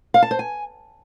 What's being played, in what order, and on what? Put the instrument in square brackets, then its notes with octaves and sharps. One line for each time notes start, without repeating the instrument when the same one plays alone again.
[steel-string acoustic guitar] F5
A5
C5
G#5